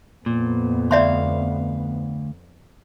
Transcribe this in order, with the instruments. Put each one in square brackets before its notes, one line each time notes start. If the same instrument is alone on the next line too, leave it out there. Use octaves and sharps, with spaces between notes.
[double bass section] F2 B3 [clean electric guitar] A#2
[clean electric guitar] D2 F5 [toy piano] D5 E5 C6